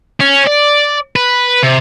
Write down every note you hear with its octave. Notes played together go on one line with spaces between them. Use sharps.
C#4
D5
B4
C3